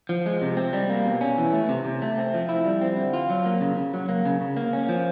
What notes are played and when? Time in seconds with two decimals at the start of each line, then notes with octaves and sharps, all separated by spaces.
0.09 F3
0.26 G#3
0.42 C3
0.57 C4
0.73 G3
0.90 A#3
1.06 B2
1.21 C#4
1.38 E3
1.53 A3
1.69 C3
1.85 C3
2.02 A3
2.18 C4
2.34 F3
2.49 E4
2.65 G3
2.82 C4
2.97 D3
3.13 F4
3.30 F#3
3.45 A#3
3.61 C#3
3.77 C#3
3.94 F#3
4.09 A#3
4.25 C#3
4.41 C#3
4.57 A#3
4.73 C#4
4.89 F3